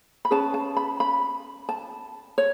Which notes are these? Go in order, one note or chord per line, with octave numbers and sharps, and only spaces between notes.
B5
C#4 G#4 B4 A5
A5
B5
B5
A5
C#5